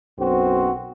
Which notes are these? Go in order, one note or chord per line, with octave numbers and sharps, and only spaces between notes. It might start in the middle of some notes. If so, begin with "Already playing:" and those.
B1 F#2 C4 F#4 C5